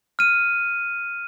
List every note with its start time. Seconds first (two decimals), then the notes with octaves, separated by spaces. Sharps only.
0.19 F6 D#7